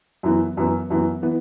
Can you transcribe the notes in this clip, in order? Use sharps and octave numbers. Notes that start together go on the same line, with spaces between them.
F#2 E3 B3
F#2 E3 B3
F#2 E3 B3
E3 B3